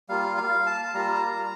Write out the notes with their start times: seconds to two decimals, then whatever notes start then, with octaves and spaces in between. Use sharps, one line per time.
0.09 G3 A#3 F4 F5
0.37 F5
0.66 A5
0.85 A5
0.94 G3 A#3 F4 A#5